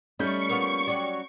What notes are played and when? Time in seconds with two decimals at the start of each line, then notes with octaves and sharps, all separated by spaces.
0.19 G3 A3 C#4 D#4 C#6 G6
0.49 A#3 B3 F4
0.87 F#3 G3